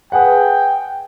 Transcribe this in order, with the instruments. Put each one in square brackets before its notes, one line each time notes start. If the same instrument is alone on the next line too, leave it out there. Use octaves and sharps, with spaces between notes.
[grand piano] G#4 B4 F#5 [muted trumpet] G5